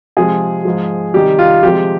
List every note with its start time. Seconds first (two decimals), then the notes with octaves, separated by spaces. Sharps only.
0.17 C3 F3 G#3 G#4
0.65 G#2 F3 G#3
1.14 C3 D#3 G3 G4
1.39 F4
1.63 C3 F3 G#3 G4